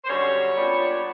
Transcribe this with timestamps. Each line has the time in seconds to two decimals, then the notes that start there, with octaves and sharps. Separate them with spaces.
0.04 C5
0.08 F#2 D3 G3 C#5
0.55 A#2 G3 B3 D4